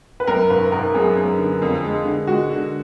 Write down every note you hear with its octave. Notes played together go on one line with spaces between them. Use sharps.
B4
F#2 A#4
G#1 B4
G#1 A#4
F#2 G#4
F#2
D3
F2
G#3
D3
G#3 F#4
D3